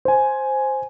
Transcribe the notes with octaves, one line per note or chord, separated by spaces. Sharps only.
C5 G#5